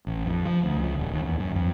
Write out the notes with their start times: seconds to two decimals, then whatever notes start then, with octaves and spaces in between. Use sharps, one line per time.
0.07 A1
0.25 F2
0.45 F3
0.63 D2
0.77 C#2
0.99 D#1
1.13 D#2
1.25 E2
1.40 F#2
1.55 F2